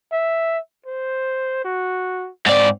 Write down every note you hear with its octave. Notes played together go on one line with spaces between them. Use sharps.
E5
C5
F#4
G#2 C4 D5